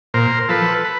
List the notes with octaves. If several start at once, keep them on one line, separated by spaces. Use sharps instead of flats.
A#2 A#4 C5
F3 A4 B4
B4